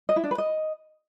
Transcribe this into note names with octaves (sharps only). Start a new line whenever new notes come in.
D#5
E4
D4
B4
D#5